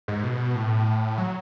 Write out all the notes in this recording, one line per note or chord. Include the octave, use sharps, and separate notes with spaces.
G#2
B2
A2
F#3